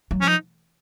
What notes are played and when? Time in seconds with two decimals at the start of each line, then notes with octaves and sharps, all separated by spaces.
0.11 F#3
0.21 F3 C#4
0.28 D#4